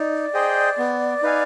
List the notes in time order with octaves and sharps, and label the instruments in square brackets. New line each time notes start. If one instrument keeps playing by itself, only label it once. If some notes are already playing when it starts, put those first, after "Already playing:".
Already playing: [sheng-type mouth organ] D#4 [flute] D5
[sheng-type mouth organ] G#4 C5 D#5 G5
B3
D#4 B4 F5 G#5